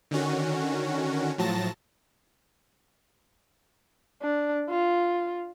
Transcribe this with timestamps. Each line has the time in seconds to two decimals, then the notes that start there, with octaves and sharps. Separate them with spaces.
0.11 D3 D#3 C#4 F#4
1.38 A2 F3 F#3 A5 A#6
4.22 D4
4.70 F4